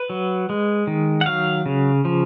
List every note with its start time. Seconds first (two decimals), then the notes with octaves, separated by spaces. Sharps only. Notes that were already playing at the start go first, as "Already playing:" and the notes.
Already playing: B4
0.10 F#3
0.50 G#3
0.87 D#3
1.21 F#5
1.26 F#3 F5
1.66 C#3
2.05 F3